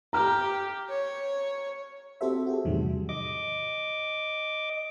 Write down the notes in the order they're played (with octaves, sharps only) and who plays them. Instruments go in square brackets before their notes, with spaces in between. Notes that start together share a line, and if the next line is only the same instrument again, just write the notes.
[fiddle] G4 [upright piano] A#5 F6
[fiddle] C#5
[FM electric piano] C4 F#4 G4 A4 C5 E5
F#4 G#4 A4
E2 A2 C3 D#3 F#3 G3
[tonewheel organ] D#5 D6